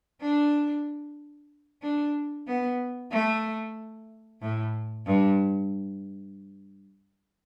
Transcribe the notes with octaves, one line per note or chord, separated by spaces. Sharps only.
D4
D4
B3
A3
A2
G2